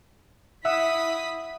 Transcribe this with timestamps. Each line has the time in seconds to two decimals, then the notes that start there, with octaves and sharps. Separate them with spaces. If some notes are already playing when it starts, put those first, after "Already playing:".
0.65 E4 E5 F#5 D#6 E6 B6